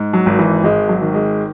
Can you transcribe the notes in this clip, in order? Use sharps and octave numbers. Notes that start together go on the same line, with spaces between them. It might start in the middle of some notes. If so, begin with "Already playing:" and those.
Already playing: G#2
F#3
G#1
E3
G#1 G#3
F#3
D#3
G#3